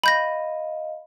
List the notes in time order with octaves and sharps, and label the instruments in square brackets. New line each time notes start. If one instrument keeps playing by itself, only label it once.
[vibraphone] D#5 F5 [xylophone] B5 G6 A#6